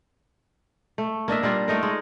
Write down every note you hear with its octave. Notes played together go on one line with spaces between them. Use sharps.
A3
A#3 D4 D#5 E5
G3 A#3 F4
A3 D#4 A#4
G#3